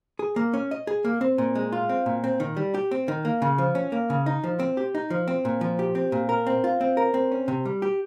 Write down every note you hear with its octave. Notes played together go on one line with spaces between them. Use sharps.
G#4
A#3
C#4
D#5
G#4
A#3
C4
A#2
G#3
F4
C4
A#2
C4
D#3
G3
G4
C4
D#3
A#3
C#3
F3
C#4
A#3
C#3
D#4
F3
C4
G4
D#4
F3
C4
A#2
F3
G4
C4
A#2
A#4
C4
F4
C4
A#4
C4
C#4
C3
G3
G4